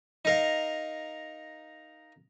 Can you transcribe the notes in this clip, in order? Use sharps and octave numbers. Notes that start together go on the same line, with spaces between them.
D#4 A#4 F5